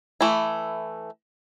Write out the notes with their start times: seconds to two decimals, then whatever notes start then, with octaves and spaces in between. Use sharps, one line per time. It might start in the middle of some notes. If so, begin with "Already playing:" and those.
0.21 E3 A3 E4